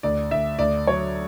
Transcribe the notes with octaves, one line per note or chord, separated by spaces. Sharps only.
D2 D5
D2 E5
D2 D5
F#3 C#5